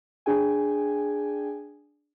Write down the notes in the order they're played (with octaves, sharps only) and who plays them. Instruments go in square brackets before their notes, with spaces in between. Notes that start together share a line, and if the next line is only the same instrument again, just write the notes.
[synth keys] D4 G#4 G5 G#5